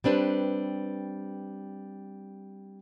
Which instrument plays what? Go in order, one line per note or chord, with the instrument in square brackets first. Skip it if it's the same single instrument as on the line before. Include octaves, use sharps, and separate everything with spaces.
[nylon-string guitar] G3 C4 D4 B4